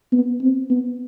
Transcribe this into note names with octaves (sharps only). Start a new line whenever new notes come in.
B3
C4
B3